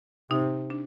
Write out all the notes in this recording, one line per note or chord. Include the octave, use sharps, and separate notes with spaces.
C3 D#4
D4